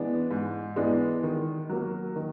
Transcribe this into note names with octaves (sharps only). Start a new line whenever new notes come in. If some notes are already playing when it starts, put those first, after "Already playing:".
Already playing: E3 G#3 B3 D4
G#2
E3 G#3 B3 D4
D#3
F#3 A#3
D#3